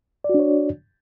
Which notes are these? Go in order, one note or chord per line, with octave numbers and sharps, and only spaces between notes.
D4 F#4 C#5 D5